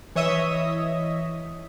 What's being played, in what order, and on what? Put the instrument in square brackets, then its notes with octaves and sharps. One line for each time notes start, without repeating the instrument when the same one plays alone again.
[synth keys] E3 C#5 D#5 E5 D#6